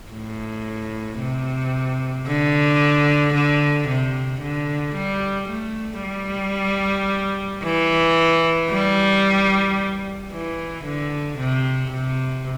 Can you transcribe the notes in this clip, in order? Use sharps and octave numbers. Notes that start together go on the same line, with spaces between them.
A2
C3
D3
D3
C3
D3
G3
A3
G3
E3
G3
E3
D3
C3
C3